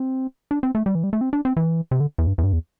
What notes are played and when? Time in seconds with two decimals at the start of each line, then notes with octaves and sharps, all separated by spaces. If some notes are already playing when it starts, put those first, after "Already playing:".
Already playing: C4
0.51 D4
0.63 C4
0.75 A3
0.86 G3
0.95 E3
1.04 G3
1.13 A3
1.21 C4
1.33 D4
1.45 C4
1.57 E3
1.91 C3
2.00 D3
2.18 E2
2.27 G2
2.38 E2
2.44 G2
2.53 E2